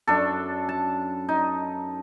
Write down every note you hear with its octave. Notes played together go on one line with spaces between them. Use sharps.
F#2 D4 A4
A5
D#4